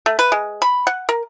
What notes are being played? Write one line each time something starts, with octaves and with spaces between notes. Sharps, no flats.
A3
B4
G#3
B5
F#5
A#4